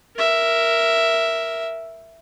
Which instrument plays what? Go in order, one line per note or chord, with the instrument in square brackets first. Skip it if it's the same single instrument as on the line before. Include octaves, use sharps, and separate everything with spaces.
[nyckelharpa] A#4 E5